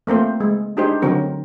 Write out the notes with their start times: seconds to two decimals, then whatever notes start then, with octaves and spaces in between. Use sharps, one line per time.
0.07 A3 A#3 C4 C5
0.40 G#3
0.77 D4 D#4 G4 G#4 C5
1.02 D3 F#3 C4 A#4